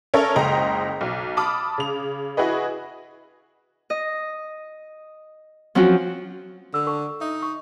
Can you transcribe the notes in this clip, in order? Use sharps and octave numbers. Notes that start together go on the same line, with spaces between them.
C#4 A4 A#4 C#5 E5
F#1 C#2 C5 D#5 G5 A#5
B1
A5 B5 D6 D#6 F6
C#3 F7
E4 F#4 G#4 B4 D#5
D#5
F3 F#3 C4 C#4 F4 F#4
D3 E6
A4 A5 C#6
D#4 E5
C#6